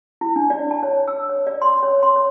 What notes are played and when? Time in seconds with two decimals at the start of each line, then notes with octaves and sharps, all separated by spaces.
0.21 E4
0.36 D4
0.50 D5
0.71 A5
0.83 C#5
1.08 E6
1.29 C#5
1.47 D5
1.62 C6
1.83 C#5
2.03 C6
2.16 C#5